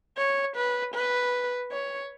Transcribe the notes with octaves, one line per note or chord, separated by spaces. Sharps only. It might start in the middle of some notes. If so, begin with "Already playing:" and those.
C#5
B4
B4
C#5